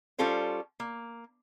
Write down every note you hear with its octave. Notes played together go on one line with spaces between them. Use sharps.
G3 C#4 F4 A4 C5 C#5
A#3